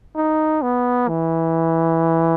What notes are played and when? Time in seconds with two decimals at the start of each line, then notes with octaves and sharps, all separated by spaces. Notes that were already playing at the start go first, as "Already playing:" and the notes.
0.16 D#4
0.62 B3
1.08 E3